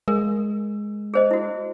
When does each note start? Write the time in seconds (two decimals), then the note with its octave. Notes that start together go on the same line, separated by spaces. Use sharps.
0.08 G#3 A#4
1.14 G#4 C5 D#5
1.31 E4 F#4